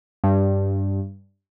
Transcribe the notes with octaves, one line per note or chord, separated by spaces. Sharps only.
G2